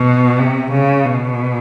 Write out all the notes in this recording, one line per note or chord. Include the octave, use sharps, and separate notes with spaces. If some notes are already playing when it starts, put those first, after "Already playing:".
Already playing: B2
C3
C#3
B2